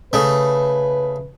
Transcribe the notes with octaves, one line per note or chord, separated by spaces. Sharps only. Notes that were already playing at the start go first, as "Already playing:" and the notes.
C#3 A3 B4